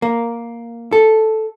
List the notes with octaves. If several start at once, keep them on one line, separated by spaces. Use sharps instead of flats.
A#3
A4